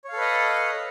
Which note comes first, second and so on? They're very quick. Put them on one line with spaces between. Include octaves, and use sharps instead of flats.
C#5 F5 A4 B4 D#5